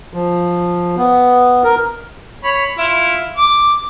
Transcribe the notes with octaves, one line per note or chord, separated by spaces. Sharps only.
F3
B3
A#4
C#5 B5
E4 F4
D6